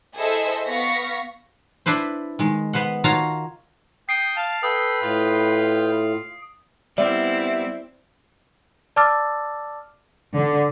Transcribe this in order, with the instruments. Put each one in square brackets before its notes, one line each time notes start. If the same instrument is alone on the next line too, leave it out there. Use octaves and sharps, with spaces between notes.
[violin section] E4 G#4 A4 C5 D#5 E5
B3 F5 C#6 A#6 B6
[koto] D4 E4 B4 C5
D#3 G#3
B3 B4 C5 F#5
D#3 F4 F#4 C#5 A5 A#5
[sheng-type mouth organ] G5 D#6 G6 [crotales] C7 D7
[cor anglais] F5 [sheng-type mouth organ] A5
[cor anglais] A4 [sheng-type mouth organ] B4 G5 [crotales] D#6
[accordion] A2 [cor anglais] F4
[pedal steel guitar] G3 B3 [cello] C4 E4 [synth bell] D5 [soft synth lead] E5
[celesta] D5 A5 D6 E6 F6 A6
[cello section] D3